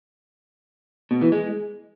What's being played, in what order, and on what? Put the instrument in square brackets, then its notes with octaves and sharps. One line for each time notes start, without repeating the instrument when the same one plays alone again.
[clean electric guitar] B2
E3
G#3